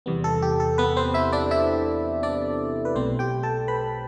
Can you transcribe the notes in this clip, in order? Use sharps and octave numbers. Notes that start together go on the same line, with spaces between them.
E2 C3 G3 B3
A4
G4
A4
B3 B4
C4 C5
E4 E5
D4 D5
E4 E5
D4 D5
B4
B1 B2 A3 C4 C5
G4 G5
A4 A5
B4 B5